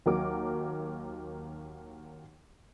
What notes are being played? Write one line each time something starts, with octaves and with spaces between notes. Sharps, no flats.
D#2 F#3 A#4 D6